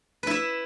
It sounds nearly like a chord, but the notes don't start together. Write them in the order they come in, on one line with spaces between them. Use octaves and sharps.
B4 E4 E5